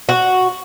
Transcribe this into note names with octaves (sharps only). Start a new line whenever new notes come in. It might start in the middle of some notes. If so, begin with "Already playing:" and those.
F#4